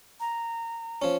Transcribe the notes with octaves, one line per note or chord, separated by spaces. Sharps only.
A#5
F3 C#4